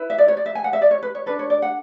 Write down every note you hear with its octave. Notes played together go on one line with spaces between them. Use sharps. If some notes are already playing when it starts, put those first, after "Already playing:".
Already playing: E4 B4
E5
D5
C#5
D5
E5
G#5
F#5
E5
D5
C#5
B4
C#5
D4 A4 B4
C#5
D5
F#5